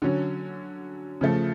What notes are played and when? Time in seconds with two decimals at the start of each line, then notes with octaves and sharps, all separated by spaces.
0.02 D3 F#3 C#4
1.21 C#3 F3 A3